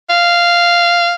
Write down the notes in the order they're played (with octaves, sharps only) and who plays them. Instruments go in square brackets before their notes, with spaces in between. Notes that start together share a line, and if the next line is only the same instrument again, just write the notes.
[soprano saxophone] F5